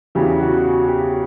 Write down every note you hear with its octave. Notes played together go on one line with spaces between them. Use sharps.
E2 C#3 E3 G4
F#4
F#4
G4